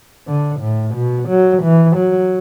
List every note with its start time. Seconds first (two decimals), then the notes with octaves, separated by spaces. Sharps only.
0.28 D3
0.61 A2
0.95 B2
1.29 F#3
1.63 E3
1.96 F#3